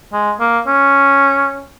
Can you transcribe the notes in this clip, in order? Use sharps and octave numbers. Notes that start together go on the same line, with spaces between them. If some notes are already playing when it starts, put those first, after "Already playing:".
G#3
A#3
C#4